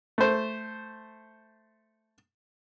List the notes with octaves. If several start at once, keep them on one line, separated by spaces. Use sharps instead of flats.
A3 C5